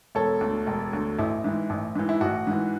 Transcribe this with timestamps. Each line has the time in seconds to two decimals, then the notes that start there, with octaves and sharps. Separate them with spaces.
0.15 E1 A4 C#5
0.41 D2 D3
0.67 E1
0.93 D2 D3
1.19 A1 E4
1.44 G#2 E3
1.70 A1
1.96 G#2 E3
2.09 E4
2.21 A1 F#4
2.47 G#2 E3